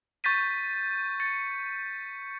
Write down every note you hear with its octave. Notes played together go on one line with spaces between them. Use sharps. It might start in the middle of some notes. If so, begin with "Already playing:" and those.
C#6 G6 A6 B6 D#7
A6 C#7